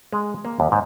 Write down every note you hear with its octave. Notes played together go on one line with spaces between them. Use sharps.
G#3
A#3
D#2
G#2